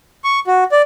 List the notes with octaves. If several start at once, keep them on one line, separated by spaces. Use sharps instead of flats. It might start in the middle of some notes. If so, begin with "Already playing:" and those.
C#6
F#4
D5